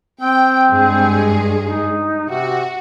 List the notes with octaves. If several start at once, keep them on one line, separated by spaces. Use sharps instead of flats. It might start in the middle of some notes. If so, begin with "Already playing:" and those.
C4 G5
G2 G#3 G#4
D#4
C3 F#4